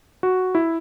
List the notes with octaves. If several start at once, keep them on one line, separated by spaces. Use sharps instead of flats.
F#4
E4